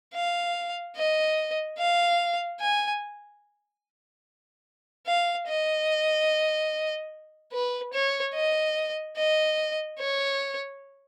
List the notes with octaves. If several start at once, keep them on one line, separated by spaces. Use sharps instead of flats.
F5
D#5
F5
G#5
F5
D#5
B4
C#5
D#5
D#5
C#5